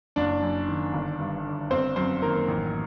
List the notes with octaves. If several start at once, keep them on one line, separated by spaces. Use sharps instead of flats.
F#1 D4 D5
F#2
D#3
G1
G2
D3
G1 C4 C5
F#2 C4 C5
D#3 A#3 A#4
A1